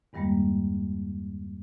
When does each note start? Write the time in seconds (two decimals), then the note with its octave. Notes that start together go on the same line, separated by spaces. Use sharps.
0.13 E2 G2 D#3 G3 G#3 A#3